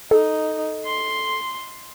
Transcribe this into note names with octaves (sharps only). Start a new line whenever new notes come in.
D#4 A4
C6